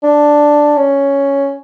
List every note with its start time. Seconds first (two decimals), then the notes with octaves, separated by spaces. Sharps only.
0.03 D4
0.76 C#4